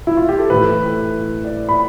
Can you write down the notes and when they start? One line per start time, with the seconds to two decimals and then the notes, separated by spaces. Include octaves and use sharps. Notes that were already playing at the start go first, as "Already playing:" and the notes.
0.07 E4
0.17 F4
0.29 G4
0.39 A4
0.50 A2 E3 A3 E4 B4
1.44 D5
1.69 B5